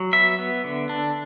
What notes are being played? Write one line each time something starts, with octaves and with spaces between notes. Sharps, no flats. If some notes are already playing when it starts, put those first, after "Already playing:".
Already playing: F#3
B3 E5
B3
D3
D4